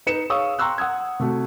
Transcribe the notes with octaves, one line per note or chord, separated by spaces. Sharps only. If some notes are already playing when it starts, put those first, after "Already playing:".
D#4 B4 C#7 E7
G#4 C#5 F5 C#6 D#6 E6
G5 A#5 C6 C#6 E6 F#6
F#5 D#6 E6 G#6
C3 A3 F#4